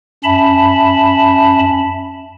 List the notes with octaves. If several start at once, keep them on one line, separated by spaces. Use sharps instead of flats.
F#2 C#4 E5 A5 B5